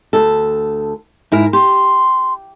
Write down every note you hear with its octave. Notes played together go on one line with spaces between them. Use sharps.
D2 A4
G#2 E4 A#4
G4 C6